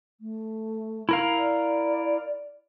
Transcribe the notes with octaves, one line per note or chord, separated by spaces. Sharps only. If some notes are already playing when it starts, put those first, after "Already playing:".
A3
E4 A#4 F5
D5